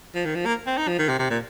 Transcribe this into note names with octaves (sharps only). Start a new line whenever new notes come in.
F3
D#3
F3
A#3
C4
D#4
F3
D#3
C3
C3
A#2